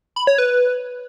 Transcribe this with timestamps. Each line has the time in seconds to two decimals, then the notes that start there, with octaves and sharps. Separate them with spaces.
0.16 B5
0.27 C#5
0.38 B4